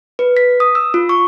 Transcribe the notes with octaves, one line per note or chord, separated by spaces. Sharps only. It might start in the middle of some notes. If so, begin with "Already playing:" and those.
B4
B6
D#6
E6
F4
C#6